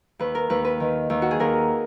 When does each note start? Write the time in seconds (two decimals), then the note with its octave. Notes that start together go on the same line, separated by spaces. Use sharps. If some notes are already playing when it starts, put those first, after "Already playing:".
0.19 D#2 B4
0.35 A#4
0.50 D#2 B4
0.65 B4
0.80 D#3
1.10 D#2
1.22 F#4
1.31 G#4
1.40 D#2 A#4